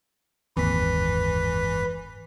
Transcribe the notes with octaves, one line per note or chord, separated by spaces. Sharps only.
F#1 D#2 G#2 E3 C4 B4 B6